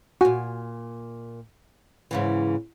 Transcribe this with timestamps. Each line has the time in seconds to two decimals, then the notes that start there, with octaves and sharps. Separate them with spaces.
0.21 A#2 F#4 G#5
2.11 G#2 C#3 E3